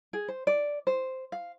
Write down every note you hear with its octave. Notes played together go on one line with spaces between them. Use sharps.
G#4
C5
D5
C5
F5